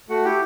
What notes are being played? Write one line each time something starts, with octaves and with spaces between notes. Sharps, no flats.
A3 F#4 F#5
E4 G4 G5